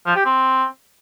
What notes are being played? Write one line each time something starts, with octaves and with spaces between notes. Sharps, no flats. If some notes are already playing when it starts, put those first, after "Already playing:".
F3
G4
C4